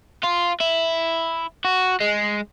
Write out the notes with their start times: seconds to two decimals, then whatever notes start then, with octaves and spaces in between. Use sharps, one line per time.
0.23 F4
0.60 E4
1.65 F#4
2.01 G#3